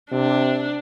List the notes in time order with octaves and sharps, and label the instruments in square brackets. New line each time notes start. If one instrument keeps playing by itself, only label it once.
[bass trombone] C3 [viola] D4